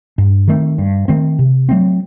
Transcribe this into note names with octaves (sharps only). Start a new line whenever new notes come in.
G2
D#3 A3 C4
G2
D#3 A3 C4
C3
F#3 A3 C4